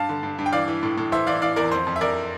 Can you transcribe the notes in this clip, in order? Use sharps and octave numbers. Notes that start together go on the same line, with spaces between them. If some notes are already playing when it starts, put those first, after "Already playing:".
Already playing: G2 F5 A5
D3
G2
G2
G5
E3 D5 F5
E3
A2
A2
E3 C5 E5
E3 D5 F5
E3 D5 F5
E2 A#4 D5
F2 C5
F2
E5
F2 A#4 D5